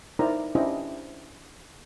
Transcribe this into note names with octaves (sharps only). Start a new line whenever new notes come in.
D#4 E4 A#4 C5 D5 A#5
C#4 D4 E4 G4 C5 D#5